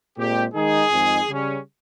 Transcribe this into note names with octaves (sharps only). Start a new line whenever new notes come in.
A#2 G#3 C4 G4
D#3 G#3 D#4 G#4
F2 D#3 G#3
C#3 G3 C#4